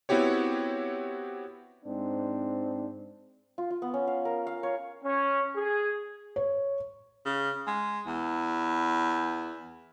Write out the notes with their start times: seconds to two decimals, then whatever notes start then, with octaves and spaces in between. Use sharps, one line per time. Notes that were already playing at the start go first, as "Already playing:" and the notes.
0.09 B3 C4 E4 F#4 G4 C#5
1.85 G#2 C4 D4
3.58 F4
3.70 F4
3.82 B3
3.94 C#4
4.07 F5
4.25 A#4
4.47 F5
4.63 C#5
5.03 C#4
5.56 G#4
6.36 C#5
7.25 C#3
7.67 G#3
8.06 E2